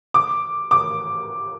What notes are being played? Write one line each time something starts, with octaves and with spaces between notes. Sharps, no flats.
D6
D6